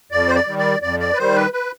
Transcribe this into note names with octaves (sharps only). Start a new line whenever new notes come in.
F2 D5
C5
D5
D#3 G3
D5
F2 D5
D5
B4
D#3 G3 C5
B4
B4